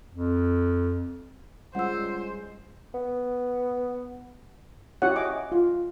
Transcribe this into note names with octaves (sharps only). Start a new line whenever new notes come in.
F2
C#2 G3 G#3 C5 F#5 E6
B3
C#4 E4 F#4 G4 C#5 F#5
D#5 G#5 D6
F4